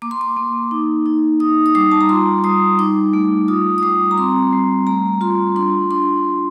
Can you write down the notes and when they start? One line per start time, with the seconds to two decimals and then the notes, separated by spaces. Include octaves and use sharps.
0.02 A#3 D6
0.11 C6
0.21 D6
0.37 A#3
0.71 D#4
1.06 D#4
1.40 D#4 D#6
1.66 D#6
1.75 G3 D6
1.92 A5
2.01 A#5
2.09 F4 C6
2.44 G3 D#6
2.79 D#4 D6
3.13 A3
3.48 F4 D#6
3.78 D#6
3.83 G3 D6
4.11 A#5
4.18 C4 C6
4.53 G3
4.87 A3 A#5
5.21 F4 C6
5.56 D4 C6
5.91 D4 C6